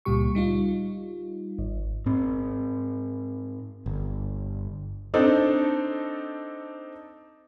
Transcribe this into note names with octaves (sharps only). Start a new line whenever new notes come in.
C#2 A#2 G3 G4 C#6
G3 D#4 F4
G#1
G#2 C4
G1
C4 D4 D#4 A4